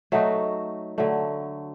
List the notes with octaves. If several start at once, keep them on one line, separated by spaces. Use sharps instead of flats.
F#3 A3 D#4 F#4
D3 F#3 A3